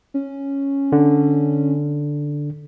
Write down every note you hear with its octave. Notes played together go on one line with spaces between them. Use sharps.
C#4
D3